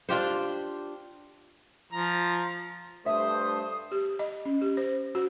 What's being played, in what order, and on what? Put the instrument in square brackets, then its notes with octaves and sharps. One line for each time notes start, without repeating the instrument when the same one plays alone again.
[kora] D4 F4 G4 C5
[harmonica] F3 A#5
[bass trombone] G2 [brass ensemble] A3 C5 [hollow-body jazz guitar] E5 [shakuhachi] D#6
[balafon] G4
D#5
C#4
G4
C5
F#4